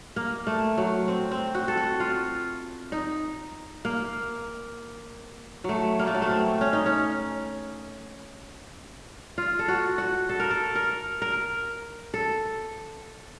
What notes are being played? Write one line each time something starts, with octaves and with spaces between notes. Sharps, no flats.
A#3
A3
F#3
C4
C4
F#4
A4
F#4
F4
D#4
A#3
F#3 A3
A#3
A3
F#3
A3
C4
C#4
D#4
C#4
F4
A4
F#4
F#4
A4
A#4
A4
A#4
A#4
A4